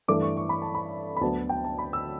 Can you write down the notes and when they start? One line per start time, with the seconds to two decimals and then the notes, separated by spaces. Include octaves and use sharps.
0.08 G2 E3 A3 D6
0.22 C#6
0.37 C#6
0.49 B5
0.62 A5
0.75 B5
1.17 B5
1.21 D2 D3 F#3 B3 D4 A5
1.49 G5
1.65 A5
1.79 B5
1.93 E6